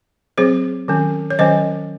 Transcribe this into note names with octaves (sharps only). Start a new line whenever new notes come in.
F#3 C4 G#4 C5
D#3 F#3 C#4
C#5
D#3 F#3 C#4 C5 D#5